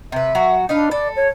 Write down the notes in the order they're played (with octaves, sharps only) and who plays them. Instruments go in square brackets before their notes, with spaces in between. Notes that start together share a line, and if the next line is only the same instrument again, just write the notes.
[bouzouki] C3 B4 [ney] E5
[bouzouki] F#3 F#4
[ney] D4 [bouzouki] D#4 B4 F5
[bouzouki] A4 [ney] D5
[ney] C#5